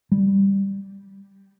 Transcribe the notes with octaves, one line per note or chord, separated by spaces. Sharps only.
G3